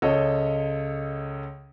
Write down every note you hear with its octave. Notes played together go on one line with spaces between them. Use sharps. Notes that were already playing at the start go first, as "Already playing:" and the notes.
C#2 A4 C#5 D#5